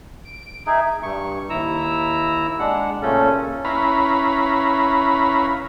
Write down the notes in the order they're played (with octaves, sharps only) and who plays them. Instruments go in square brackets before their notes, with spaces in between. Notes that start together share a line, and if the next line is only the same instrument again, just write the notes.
[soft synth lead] D7
[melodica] D#4 G#4 [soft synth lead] E5
[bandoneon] G2 C#6
D#2 E4 A#5 E6
G#3 D4 F#5
A#2 C#3 A3 C#4 A4
[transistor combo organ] C#4 E4 B4 F5 A#5 B5